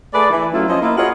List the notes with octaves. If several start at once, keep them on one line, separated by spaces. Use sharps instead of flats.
A3 G#4 B4 D5
E3
F#3 A3 C#4 E4 F4
F3 C#4 C5 D#5
A#3 E4 F4
F4 F#4 G#4 A#4 C#5 D#5